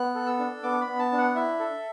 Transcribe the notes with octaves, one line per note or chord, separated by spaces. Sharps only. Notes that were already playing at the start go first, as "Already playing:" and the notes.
Already playing: B3 F#6
A4
E6
D4
B3 D6
B5
B3
A5
D4
F#5
E4 E5
A4